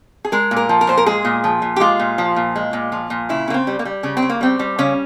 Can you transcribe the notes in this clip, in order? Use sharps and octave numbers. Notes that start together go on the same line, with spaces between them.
G#4
G#3 A#4
A#2
A#4
F3
A#4
A#2 C5
A#4
G#3 G#4
A#2
F3
A#2
G4
G#3 F4
A#2
F3
A#2
G#3
A#2
F3
A#2
C#3 E4
C#3 A#3
C4
G3
A#3
G3
C#3 C#4
C4
C#3
A#3
G3 C4
G3
C#3 C#4